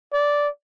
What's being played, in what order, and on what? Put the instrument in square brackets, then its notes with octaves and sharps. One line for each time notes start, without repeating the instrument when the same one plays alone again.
[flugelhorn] D5